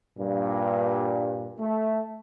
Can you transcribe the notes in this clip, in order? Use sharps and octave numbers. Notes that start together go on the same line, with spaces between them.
G2 A#2
A3